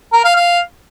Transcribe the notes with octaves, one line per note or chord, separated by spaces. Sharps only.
A#4
F5
F5